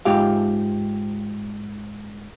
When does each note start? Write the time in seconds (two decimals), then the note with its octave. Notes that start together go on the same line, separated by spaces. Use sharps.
0.05 G#2 F4 G4 F5